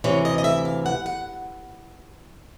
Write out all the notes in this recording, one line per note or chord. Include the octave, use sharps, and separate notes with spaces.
D2 C3 E3 C#5
D#5
D#5
E5
F5
F#5
F#5